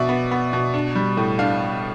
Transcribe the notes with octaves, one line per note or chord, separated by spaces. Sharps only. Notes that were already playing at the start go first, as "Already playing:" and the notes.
Already playing: B2 D5 E5
B3
B3
B2
D4
G3
A2
D4 F5